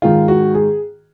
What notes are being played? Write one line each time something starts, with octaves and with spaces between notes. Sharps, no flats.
G#2 D#3 G#3 F4
F#4
G#4